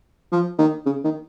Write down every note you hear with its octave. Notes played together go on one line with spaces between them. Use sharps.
F3
D#3
C#3
D#3